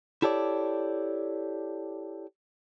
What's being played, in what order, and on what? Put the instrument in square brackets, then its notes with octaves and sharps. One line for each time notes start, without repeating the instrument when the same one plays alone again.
[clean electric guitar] E4 G4 A4 C#5 D5